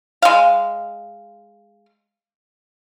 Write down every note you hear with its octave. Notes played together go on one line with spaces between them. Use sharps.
G#3 F5